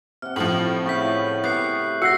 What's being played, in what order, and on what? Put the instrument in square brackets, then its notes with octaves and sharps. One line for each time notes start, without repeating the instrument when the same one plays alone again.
[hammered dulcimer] C3 F#5 [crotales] F6
[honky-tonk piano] A2 F3 [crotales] F#7
[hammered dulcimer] C#3 A3 E4 [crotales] C#6 G6 B6
[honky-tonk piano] B3 [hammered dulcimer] G4 [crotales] F#6 C7
[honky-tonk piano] F#4 F#6 [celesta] E6 C7 [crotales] A#6 C#7